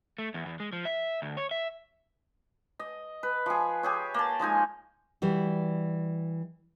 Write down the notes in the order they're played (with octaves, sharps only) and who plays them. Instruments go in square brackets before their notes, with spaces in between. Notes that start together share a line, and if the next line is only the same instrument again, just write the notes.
[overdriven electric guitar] A3
E2
E2
G#3
F3
E5
D2
C#5
E5
[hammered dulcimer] D#5
B4
F3 G#4
G4 G#4 C#5
A#3 A5
F3 G#3 D#4 G#5
[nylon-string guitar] E3 G3 F#4